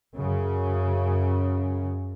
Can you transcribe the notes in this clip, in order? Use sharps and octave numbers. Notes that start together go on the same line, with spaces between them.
F#2 C#3